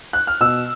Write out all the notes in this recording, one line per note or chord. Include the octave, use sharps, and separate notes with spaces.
F#6
F6
B2 E6